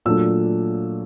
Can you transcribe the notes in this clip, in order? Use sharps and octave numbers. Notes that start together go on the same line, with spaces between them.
A#2 F#3 A3 D4 E6